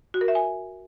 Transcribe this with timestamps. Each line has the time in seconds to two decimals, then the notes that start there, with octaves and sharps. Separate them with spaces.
0.14 F#4
0.21 A#4
0.28 E5
0.35 G#5